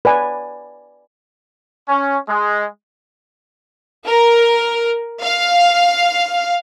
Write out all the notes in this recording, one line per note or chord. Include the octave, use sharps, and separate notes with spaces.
B4 D5 G#5
C#4
G#3
A#4
F5